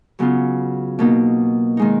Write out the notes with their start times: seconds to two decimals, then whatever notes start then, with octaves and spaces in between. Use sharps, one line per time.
0.19 C#3 F#3 B3 F4
0.99 B2 A#3 D#4
1.77 D#3 G#3 D#4